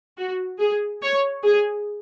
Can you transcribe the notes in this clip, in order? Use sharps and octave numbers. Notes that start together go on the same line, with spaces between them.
F#4
G#4
C#5
G#4